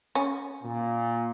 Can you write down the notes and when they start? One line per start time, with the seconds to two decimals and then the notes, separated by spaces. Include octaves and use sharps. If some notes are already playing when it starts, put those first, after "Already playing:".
0.15 C#4
0.64 A#2